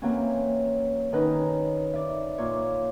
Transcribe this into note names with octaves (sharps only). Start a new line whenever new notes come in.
E3 F#3 A#3 C4 C#4
D#3 F#3 C#4 D#4 B4
D5 E5
A#2 F4 C#5 D6